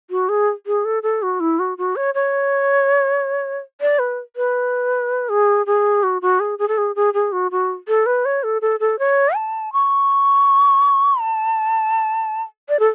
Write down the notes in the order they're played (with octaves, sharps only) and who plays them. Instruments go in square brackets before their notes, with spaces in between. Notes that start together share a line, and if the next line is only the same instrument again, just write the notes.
[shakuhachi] F#4
G#4
G#4
A4
A4
F#4
E4
F#4
F#4
C#5
C#5
D5
B4
B4
G#4
G#4
F#4
F#4
G#4
G#4
A4
G#4
G#4
G#4
F#4
F#4
A4
B4
C#5
A4
A4
A4
C#5
A5
C#6
A5
D5
A4